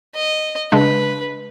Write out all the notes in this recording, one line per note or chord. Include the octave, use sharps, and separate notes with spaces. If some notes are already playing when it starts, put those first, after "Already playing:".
D#5
C#3 G#3 D4 B4